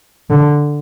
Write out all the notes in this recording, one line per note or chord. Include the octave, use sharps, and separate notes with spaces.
D3